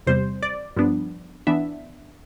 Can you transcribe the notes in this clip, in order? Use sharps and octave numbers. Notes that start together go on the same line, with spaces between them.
E2 C3 G3 C5
D5
G2 F3 B3 D4
E3 B3 D4 E5